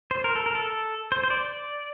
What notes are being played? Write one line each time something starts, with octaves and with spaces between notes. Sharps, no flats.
C5
A#4
A4
A#4
A4
C5
C5
D5